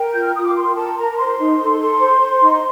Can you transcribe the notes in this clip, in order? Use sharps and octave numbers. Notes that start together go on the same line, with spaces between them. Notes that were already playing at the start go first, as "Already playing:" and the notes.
Already playing: A#4 G5
F4 G6
F6
F4 D#6
D6
A#4 C6
A#4 A5
A#4 A#5
C5 C6
D#4
A4
A4
C5
C5
D#4